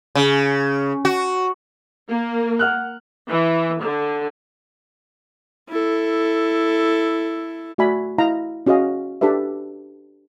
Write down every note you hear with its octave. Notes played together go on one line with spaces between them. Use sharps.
C#3
F#4
A#3
F#5 F6 F#6
E3
D3
E4 A4
A3 F#4 D5 E5 G#5 B5
E4 D#5 F5 A#5
C#4 F#4 G#4 D#5 F5
D4 G4 A4 B4 E5